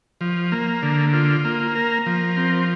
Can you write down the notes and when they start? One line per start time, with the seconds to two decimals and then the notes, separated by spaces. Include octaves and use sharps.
0.21 F3
0.52 A#3
0.83 D3
1.13 F4
1.45 A#3
1.75 A#4
2.06 F3
2.37 C4